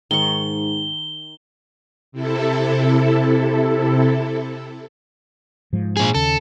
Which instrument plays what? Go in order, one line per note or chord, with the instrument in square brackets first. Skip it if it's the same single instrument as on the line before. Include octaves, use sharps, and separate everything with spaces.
[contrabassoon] G#2 [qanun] D#3 C#6 [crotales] G7
[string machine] C3 E4 A4
[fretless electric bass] G#2 F3
[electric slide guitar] A#2 G#4
[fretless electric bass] D#2 C#3 [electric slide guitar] A4